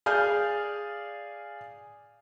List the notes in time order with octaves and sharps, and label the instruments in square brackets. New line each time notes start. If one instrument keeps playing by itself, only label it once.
[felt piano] G#4 D5 F5 G#5 F6 G6